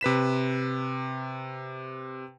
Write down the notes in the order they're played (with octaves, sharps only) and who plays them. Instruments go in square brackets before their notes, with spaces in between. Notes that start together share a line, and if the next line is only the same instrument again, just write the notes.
[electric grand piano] C3 B4 B6 E7